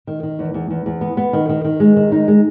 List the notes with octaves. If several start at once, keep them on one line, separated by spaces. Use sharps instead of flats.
D#3
D#3
E2
E2
E2
E2
B3
B3
D#3
D#3
D#3
G#3
D#3
D#4
G#3